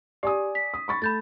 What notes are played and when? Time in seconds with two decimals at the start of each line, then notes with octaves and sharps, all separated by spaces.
0.23 G4 D5 G#5 D#6
0.55 B6
0.74 D#6
0.88 B5 C#6 A6
1.02 A3 B5 G6 A6